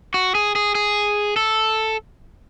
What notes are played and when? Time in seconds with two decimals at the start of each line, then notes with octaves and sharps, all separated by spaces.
0.14 F#4
0.35 G#4
0.55 G#4
0.75 G#4
1.36 A4